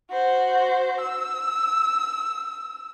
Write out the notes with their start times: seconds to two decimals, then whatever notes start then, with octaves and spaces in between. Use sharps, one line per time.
0.11 F#4 C5
1.01 E6